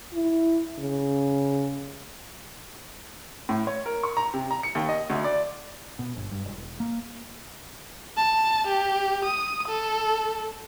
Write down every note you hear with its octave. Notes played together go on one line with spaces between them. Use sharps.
E4
C#3
A2
C#5
A#4
C#6
A#5
C3
A#5
C#7
D#2
D#5
D2
D5
B2
G1
G2
E1
A#3
A5
G4
D#6
A4